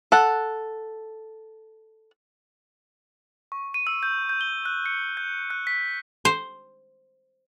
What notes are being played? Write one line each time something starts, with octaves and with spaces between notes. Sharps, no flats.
A4 F#5
C#6
D#7
E6
G6
G6
G7
F#6
C#7
G6
F#6
B6
C5